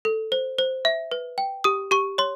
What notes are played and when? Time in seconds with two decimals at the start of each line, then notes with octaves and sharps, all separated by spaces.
0.05 A4
0.32 C5
0.59 C5
0.85 E5
1.12 B4
1.38 G5
1.64 G4 D#6
1.91 G4 C#6
2.18 C#5 C6